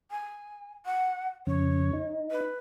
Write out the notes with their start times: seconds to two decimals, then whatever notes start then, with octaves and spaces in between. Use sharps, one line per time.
0.11 G#5
0.86 F#5
1.47 F2 C#3 C#5
1.93 D#4
2.31 B4